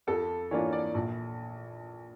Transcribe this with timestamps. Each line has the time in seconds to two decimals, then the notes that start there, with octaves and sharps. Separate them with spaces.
0.07 F2 A4
0.51 E3 A#3 D4 F4 C#5
0.73 D5
0.94 A#1